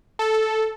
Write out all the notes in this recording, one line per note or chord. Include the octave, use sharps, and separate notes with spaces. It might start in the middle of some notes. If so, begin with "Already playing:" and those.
A4